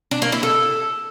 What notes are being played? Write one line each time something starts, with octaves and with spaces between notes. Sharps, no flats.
D4
A#3
E4
A4